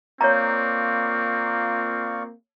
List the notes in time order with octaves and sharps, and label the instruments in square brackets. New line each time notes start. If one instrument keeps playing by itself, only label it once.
[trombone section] A#3 F4 [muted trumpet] C4 [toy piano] C#5 A#5 [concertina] D5 F5 C#6